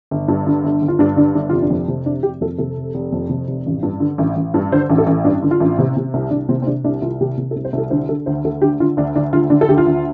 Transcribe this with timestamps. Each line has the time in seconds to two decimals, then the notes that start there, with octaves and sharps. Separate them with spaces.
0.11 G1
0.28 G2
0.47 D3
0.64 G1
0.82 G1
0.88 F4
0.99 G2 D4
1.17 D3 D4
1.35 G1 D4
1.49 F1 F4
1.63 D4
1.70 F2
1.88 C3
2.06 F1 D4
2.23 F1 G4
2.41 F2 A4
2.58 C3 A4
2.77 F1
2.94 F1
3.12 F2
3.29 C3
3.48 F1
3.66 A1
3.83 G2
4.00 D3
4.18 A1
4.36 A1
4.54 G2
4.72 D3 C5
4.90 A1
4.98 A4
5.07 A1
5.24 G2 D4
5.43 D3
5.51 F4
5.60 A1
5.78 C3
5.97 C3
6.14 C2
6.31 C2 D4
6.49 C3 C4
6.62 C4
6.67 C3 D4
6.84 C2 D4
7.02 C2 F4
7.21 C3 G4
7.37 C3
7.51 A4
7.56 C2
7.65 C5
7.73 C2 A4
7.90 D3 C5
8.09 D3 A4
8.26 D2 C5
8.45 D2 A4
8.62 D3 G4
8.80 D3 F4
8.97 D2 D4
9.16 D2 D4
9.33 D3 F4
9.50 D3 D4
9.61 A4
9.68 D2 G4
9.78 F4
9.86 D2